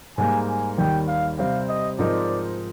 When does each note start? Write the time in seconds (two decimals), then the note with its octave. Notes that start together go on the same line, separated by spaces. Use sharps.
0.18 G#2 G3 A#3 G#5
0.48 G#5
0.78 D#2 D#3 G3 G5
1.08 F5
1.38 C3 G3 C4 G4 F5
1.69 D#5
1.99 G#2 F3 C4 D#4 A#4 D5